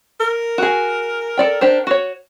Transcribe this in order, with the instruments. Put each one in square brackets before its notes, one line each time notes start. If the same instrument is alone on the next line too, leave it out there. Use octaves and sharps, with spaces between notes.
[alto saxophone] A#4
[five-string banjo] F#4 G#4
A4 D5 G5
D4 G4 C5
F#4 C#5